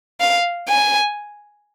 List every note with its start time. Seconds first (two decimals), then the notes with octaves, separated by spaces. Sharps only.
0.20 F5
0.68 G#5